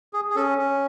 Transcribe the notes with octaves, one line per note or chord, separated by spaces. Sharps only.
G#4
G#4
C#4 A4
C#4